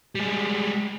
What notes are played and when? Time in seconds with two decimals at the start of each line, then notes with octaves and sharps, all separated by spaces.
0.15 G3 G#3